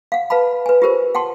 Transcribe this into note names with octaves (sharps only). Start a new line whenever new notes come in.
F5 F#5
B4 F5 A5 B5
B4 G#5
F4 G4 A#4 C5
F#5 G5 A5 C6